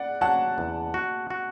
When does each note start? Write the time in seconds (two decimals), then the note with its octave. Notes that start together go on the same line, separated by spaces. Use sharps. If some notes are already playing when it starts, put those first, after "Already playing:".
Already playing: D5 F#5
0.21 F#3 F#5 A5
0.58 E2
0.94 F#4
1.30 F#4